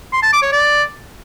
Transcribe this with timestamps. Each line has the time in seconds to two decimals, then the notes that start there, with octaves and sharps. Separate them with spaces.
0.13 C6
0.23 A5
0.33 D6
0.42 C#5
0.52 D5